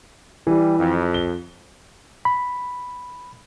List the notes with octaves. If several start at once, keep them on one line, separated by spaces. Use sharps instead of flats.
E3 G3
F2
G7
B5